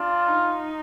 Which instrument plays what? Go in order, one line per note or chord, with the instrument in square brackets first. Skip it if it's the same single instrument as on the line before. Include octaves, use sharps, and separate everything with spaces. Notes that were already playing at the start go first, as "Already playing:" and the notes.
Already playing: [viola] D4 [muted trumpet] F4
[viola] D#4